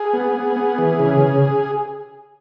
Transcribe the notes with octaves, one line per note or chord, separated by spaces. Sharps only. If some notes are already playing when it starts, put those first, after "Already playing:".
Already playing: G#4
B3
B3
B3
E3
C#3
C#3